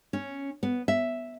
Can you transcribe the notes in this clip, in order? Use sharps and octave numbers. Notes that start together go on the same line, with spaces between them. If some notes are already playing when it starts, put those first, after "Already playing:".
C#4
B3
E5